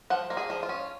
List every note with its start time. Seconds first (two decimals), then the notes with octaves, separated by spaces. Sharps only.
0.10 F3 F#5
0.30 A#3
0.37 G#4
0.50 F3
0.63 F4
0.69 C#4